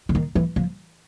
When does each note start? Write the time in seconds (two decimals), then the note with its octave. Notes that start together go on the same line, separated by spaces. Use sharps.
0.09 D3
0.15 D#3
0.35 E3
0.56 F3